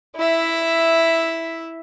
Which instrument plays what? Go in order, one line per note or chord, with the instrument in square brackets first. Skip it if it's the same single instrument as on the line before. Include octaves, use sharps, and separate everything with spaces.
[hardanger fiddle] E4 E5